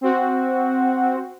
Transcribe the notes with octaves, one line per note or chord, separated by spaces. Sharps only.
C4 F#4